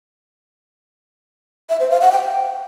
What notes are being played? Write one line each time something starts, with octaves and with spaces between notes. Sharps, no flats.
E5
C5
F5
F#5
G5